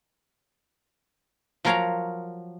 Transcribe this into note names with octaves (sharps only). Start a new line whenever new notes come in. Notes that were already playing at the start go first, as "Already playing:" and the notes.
F3 F#3 A#4 C#5 F5 A#5